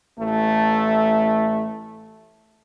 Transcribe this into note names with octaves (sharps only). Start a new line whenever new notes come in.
A1 A3